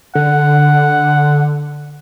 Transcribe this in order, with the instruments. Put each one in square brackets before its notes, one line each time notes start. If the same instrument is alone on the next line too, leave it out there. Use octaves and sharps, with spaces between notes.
[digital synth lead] D3 [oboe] F#5